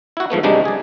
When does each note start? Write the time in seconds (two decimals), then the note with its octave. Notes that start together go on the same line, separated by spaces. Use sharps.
0.17 E4 F#4
0.30 G#2 F3 A3 B3
0.43 F#2 C3 G3 G#3 D4 D#4
0.65 G#4 D5